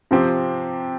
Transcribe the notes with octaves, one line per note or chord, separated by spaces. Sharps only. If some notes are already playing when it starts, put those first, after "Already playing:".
C3 F3 C4 G4